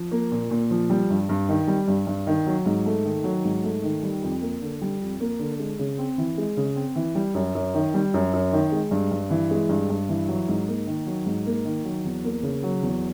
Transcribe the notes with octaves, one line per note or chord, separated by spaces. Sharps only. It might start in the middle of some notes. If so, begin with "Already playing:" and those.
Already playing: F3
A#3
A#2
A#2
F3
G3
G2
G2
D#3
G3
G2
G2
D#3
F#3
G#2
A3
D#3
F#3
G#2
A3
D#3
G3
F2
A#3
D3
G3
F2
A#3
D3
G#3
C#3
C4
E3
G#3
C#3
C4
E3
G3
F#2
F#2
D#3
G3
F#2
F#2
D#3
G#3
G2
G2
E3
G#3
G2
G2
E3
F#3
G#2
A#3
D#3
F#3
G#2
A#3
D#3
F#3
E2
A#3
C#3
F#3
E2